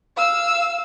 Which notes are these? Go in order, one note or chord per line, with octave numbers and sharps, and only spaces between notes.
F5 E6